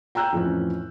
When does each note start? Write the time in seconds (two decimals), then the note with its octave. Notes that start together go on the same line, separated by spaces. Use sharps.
0.15 G5 A#5 E6 F#6 G6
0.32 F2 A2 E3 C#4